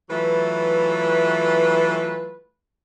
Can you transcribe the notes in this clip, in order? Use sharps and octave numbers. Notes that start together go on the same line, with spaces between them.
E3 F#3 A3 F4 B4